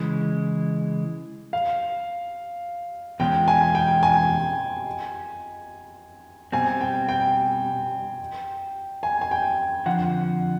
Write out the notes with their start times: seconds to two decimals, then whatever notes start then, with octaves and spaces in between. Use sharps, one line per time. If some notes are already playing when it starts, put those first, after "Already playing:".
Already playing: C#3 E3 G#3
1.53 F5
3.20 E2 B2 G#3 C#4 F4 G5
3.48 G#5
3.75 G5
4.03 G#5
6.52 B2 G3 C4 G#5
6.81 G5
7.09 G5
9.03 G#5
9.21 G#5
9.31 G5
9.86 F2 D3 F3 F#5